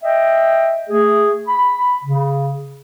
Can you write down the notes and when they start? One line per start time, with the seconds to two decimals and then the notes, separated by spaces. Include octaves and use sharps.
0.03 D#5 E5 G5
0.89 A3 G#4
1.48 B5
2.04 C#3